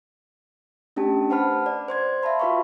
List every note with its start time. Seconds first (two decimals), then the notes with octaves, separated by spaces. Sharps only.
0.96 A3 C#4 D4 G4 A5
1.30 B4 C5 F#5 A5 B5 F6
1.66 D5
1.88 C5 C6 G#6
2.23 E5 F5 A5 B5 C6
2.40 F4 F#4 B4 F5 B5 C#6